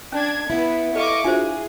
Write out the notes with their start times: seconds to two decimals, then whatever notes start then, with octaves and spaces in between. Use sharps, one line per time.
0.12 C#4 D4 G#6
0.50 B3 E4
0.96 G4 A4 B4 D#5 F5 C#6 D6
1.24 D4 F4 F#4 G#4 C5 E5 G#5